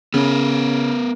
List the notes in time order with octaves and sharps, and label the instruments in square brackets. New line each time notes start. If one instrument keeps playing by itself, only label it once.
[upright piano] C#3 [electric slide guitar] B3 A#4